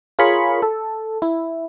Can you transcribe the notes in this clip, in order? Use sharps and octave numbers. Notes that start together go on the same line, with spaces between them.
F4 G#4 A#4 C#5 B5 C#6
A4
E4